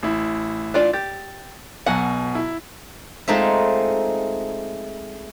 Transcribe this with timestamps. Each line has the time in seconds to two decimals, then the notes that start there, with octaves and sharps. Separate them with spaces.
0.03 A1 E4
0.74 D4 F4 D5
0.93 G4 A6
1.86 B1 B2 F#3 F#5 G#5
2.35 E4
3.28 G#3 A3 C4 D#4 F4 E5